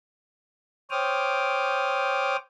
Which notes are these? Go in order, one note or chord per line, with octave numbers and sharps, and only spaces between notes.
C5 C#5 G5 D6 D#6 F6